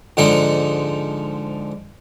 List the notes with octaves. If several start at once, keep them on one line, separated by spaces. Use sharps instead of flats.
G#2 D3 F3 D#4 F#5